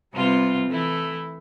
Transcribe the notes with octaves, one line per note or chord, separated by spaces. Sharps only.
C3 G3 B3 F4
E3 A3 E4